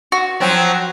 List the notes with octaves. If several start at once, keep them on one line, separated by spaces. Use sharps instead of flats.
F#4
F3 F#3 C4